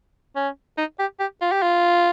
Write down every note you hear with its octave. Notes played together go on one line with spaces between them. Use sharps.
C#4
D#4
G4
G4
F4
G4
F4